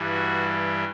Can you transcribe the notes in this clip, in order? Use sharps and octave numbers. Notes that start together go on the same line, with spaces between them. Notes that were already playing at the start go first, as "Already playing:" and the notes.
Already playing: G2 E3 G3
F#4